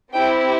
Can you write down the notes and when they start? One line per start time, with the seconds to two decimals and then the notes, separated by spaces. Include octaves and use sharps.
0.13 C4 E4 G4 G5